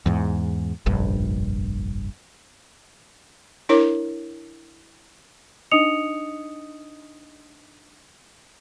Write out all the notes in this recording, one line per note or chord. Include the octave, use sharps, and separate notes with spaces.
E2 G#2
F1 A#1 G2
D4 E4 A#4 C#5 D6
D4 D#4 D#5 D#6 C#7 F7